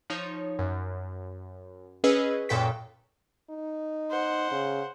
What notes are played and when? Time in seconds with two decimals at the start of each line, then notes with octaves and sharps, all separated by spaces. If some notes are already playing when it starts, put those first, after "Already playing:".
0.10 F3 D#4 C#5
0.59 F#2
2.04 C#4 G#4 B4 D#5 E6
2.49 F#2 A#2 A4 G5 C#6 B6
3.50 D#4
4.10 C5 F#5
4.51 C#3